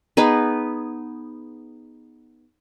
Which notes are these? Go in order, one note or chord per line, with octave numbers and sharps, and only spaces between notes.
B3 D#4 G#4 B4